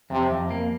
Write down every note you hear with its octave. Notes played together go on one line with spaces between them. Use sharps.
F2 C3
F2
A#3